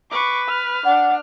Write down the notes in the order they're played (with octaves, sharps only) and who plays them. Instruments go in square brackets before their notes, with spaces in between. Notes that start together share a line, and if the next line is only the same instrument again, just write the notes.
[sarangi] B4 [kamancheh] C#6 D6
[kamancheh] F6
[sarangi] D4 [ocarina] F#5